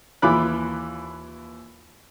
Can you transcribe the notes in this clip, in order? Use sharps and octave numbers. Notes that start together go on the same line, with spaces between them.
D#2 E3 F4 B5 D6 F#6